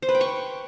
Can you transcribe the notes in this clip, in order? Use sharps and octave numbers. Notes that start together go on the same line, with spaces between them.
C5
B4
G5
C#6